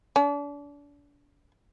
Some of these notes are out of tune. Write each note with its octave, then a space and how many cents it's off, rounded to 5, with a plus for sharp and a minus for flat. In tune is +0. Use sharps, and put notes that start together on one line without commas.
D4 -35